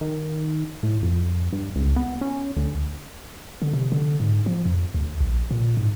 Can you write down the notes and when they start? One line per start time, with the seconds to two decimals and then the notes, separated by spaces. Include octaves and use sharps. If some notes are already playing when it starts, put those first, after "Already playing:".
0.01 D#3
0.83 A2
1.02 F2
1.53 G2
1.76 C#2
1.96 B3
2.21 C#4
2.57 D2
3.62 D3
3.73 C3
3.92 D3
4.20 G#2
4.46 F3
4.66 F2
4.94 D2
5.20 A#1
5.51 A#2
5.77 G#2